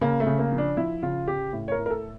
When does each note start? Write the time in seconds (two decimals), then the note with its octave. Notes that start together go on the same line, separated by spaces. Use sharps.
0.01 C#3 A#3
0.20 A3
0.26 C#3
0.39 A#3
0.52 F3
0.58 D4
0.77 F3 E4
1.03 C#3 F4
1.28 C#3 G4
1.53 A2
1.68 C#5
1.72 A#4
1.79 A2
1.86 A#4
1.91 A4